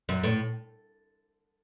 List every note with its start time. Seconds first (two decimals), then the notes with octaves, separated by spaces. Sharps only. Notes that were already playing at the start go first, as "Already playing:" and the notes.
0.09 F#2
0.23 A2